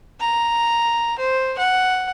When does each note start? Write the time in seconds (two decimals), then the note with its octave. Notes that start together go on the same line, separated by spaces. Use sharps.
0.20 A#5
1.19 C5
1.58 F#5